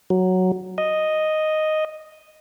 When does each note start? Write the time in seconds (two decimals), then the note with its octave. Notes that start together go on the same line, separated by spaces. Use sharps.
0.10 F#3
0.78 D#5